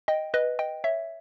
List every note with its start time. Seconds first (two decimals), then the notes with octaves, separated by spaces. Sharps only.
0.08 D#5 G5
0.34 B4 D#5
0.59 D#5 G5
0.84 C#5 E5